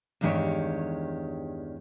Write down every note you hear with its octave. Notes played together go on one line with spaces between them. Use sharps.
E2 G2 D#3 G#3 G4 C#5